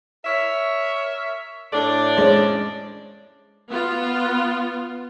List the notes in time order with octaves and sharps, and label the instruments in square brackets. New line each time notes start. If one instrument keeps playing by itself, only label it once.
[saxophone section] A#4 C#5 E5
[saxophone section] A2 D5 [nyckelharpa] D4
[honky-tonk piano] G#3 C#4 C5
[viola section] B3 F4